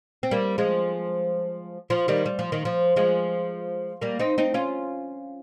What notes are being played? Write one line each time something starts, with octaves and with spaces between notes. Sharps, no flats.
C4
G3 A#3
F3 G#3
F3
D#3 G3
G3
F3
D#3
F3
F3 G#3
G3 A#3
C4 D#4
C4 D#4
C#4 F4